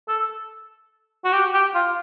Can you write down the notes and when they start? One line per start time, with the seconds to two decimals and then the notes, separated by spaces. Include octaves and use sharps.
0.08 A4
1.25 F#4
1.33 G4
1.54 G4
1.75 F4